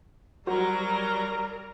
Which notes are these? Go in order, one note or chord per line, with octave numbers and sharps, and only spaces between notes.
F#3 G3 F#4 A#4 C5 A#5